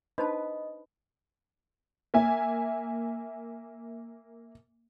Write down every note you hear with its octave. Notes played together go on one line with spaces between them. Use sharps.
D4 D#4 B4 C5 D#5 A5
A#3 E5 G#5